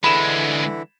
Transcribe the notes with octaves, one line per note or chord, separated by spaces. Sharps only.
D2 D3 E3 G#3 E4 B5 E7